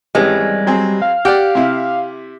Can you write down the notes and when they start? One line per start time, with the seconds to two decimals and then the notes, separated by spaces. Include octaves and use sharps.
0.15 G#1 E3 G3 G#3 C#4
0.67 F#3 C4 G#4
1.02 F5
1.25 G4 D5 F#5 G5
1.55 C3 E4